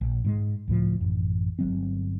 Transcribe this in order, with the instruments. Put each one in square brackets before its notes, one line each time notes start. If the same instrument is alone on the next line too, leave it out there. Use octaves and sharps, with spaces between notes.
[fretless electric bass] A#1
G#2 F#3 G#3
C#2 A2 F3
A1 F#2
G1 F#3 C4